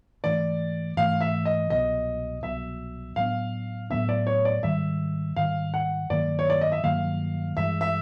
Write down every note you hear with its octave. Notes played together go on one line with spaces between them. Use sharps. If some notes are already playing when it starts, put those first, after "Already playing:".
G#2 E3 A3 D4 D5
G#2 E3 A3 D4 F5
E5
D#5
C2 B2 F#3 D#5
C2 B2 F#3 E5
A2 F#3 B3 D4 F5
A2 F#3 B3 D4 E5
D5
C#5
D5
G#2 D#3 G3 E5
G#2 D#3 G3 F5
F#5
G2 D#3 F#3 A#3 D5
C#5
D5
D#5
E5
G2 D#3 F#3 A#3 F5
G2 E3 G#3 E5
E5